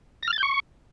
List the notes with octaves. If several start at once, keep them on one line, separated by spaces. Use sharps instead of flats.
A#6
F6
A6
G6
C#6